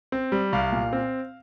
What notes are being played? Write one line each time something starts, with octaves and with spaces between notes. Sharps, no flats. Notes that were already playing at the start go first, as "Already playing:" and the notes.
C4
G3
C2 F5
A#2
C4